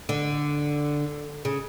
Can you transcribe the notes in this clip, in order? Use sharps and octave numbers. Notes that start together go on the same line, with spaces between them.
D3
C#3